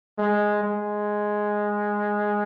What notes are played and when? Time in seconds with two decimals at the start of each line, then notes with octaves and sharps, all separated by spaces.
0.18 G#3
0.63 G#3